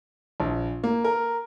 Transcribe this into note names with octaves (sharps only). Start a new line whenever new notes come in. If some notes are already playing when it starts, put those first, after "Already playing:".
A#1
A#3
A#4